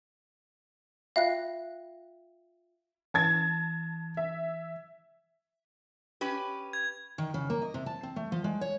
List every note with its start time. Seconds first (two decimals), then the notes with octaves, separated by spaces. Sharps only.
1.16 F4 E5 F5 G5 F#6
3.14 E3 A5 G#6 A6
4.17 E5
6.21 C#4 G4 B4
6.73 G#6
7.18 D#3
7.34 C#3
7.50 A#3
7.62 D#5
7.74 C3
7.86 A5
8.03 C4
8.16 A3
8.32 F3
8.44 G#3
8.61 C#5